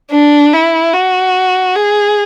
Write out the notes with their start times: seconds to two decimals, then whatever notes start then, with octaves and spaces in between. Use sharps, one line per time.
0.11 D4
0.53 E4
0.93 F#4
1.76 G#4